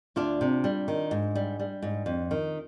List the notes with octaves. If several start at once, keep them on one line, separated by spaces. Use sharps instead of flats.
D2 D4 F4
C3
G3
D#3
G#2
G3
G3
G#2
F2
D#3